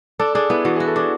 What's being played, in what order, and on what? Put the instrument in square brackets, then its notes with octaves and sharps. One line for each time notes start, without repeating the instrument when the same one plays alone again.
[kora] D4 [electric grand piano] A4
[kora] D4 [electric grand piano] G#4
[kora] B3 [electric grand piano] E4
[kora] E3 [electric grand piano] F#4
[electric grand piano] G#4
[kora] F#4
[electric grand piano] A4
[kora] D4 [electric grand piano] G#4